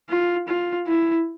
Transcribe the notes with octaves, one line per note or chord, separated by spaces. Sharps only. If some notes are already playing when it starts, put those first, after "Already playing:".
F4
F4
E4